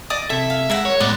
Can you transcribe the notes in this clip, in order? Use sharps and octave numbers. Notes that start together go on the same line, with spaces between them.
D5 D#5 D#6
C3 E4 A4 E5
F5
G#3 A#4 E5 F#5
C#5
A2 G#3 B3 D5